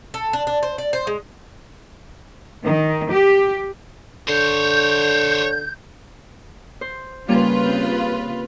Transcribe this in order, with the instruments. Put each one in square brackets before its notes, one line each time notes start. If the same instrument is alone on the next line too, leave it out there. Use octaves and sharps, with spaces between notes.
[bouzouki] A4
D4
D4
C5
D5
C5
G#3
[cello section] D#3
G4
[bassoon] D3 [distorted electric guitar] C5 C#5 [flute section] G6
[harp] C5
[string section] C#3 F4 B4 [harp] G3 A#3 C#4
[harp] C4